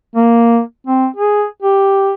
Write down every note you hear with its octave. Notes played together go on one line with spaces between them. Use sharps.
A#3
C4
G#4
G4